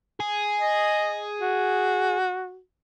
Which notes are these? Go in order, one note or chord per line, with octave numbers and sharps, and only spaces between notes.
G#4
D#5
F#4